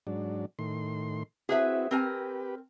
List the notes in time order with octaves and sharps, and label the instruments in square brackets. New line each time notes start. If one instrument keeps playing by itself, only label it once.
[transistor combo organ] G#2 F#3 D4
A2 D#3 C6
[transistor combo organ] C4 E4 F#4 [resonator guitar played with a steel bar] G#4 B4 E5
[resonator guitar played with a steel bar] C4 A#4 G#5 [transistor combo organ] G4 B4